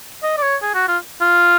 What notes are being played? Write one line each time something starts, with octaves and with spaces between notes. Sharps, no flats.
D#5
D5
C#5
G#4
F#4
F4
F4